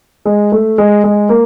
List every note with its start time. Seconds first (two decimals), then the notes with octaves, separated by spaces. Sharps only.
0.25 G#3
0.52 A3
0.78 G#3
1.04 G#3
1.29 A#3